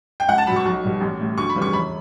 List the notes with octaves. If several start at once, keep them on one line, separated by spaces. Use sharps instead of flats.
G5
C#2 F#5
A5
B2 F#3 B5
C#6
B1
B2 G3
A1
A2 G3
D2 C#6
B5
C#3 E3 G3
C#6
E1 B5